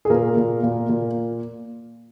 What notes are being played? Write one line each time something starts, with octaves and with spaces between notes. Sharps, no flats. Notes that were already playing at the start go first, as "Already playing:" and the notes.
G#4
A#2 A#4
A#2
A#2
A#2